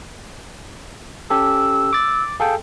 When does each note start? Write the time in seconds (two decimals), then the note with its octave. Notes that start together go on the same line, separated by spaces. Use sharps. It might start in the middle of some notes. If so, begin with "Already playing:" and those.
1.30 C#4 G4 A4 E6
1.93 D6 A6
2.40 G#4 A4 F5 G5